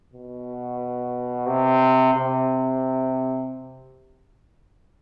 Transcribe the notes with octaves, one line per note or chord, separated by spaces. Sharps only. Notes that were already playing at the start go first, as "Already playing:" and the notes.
B2
C3
C3